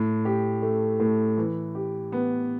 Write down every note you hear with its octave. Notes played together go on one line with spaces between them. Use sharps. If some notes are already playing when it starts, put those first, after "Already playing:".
Already playing: A2
G4
A3
A2
E3
G4
B3